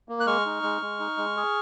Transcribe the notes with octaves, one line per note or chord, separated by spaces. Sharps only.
A#3
F#6
G#3 C#6 F6
D#4
G#3
G#3
D#4
G#3
G#4